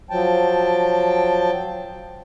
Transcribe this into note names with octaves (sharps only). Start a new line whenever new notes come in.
F3 F#3 G5 A5